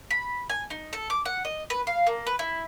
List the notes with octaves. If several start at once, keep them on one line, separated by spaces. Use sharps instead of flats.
B5
G#5
D#4
A4
D6
F#5
D#5
B4
F5
A#3
B4
E4